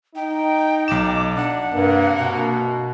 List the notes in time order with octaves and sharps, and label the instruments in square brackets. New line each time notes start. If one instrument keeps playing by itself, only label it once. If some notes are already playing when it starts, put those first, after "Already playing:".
[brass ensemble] D#4 [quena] G5
[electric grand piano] B1 E7 [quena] D6
[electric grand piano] D4 [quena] F#5
[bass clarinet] G2 [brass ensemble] C3 A#3
[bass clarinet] B2